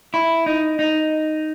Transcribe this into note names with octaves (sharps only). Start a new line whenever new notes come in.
E4
D#4
D#4